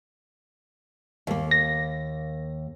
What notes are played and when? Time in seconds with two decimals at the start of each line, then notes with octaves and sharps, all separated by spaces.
1.27 D#2 A#3
1.51 A#6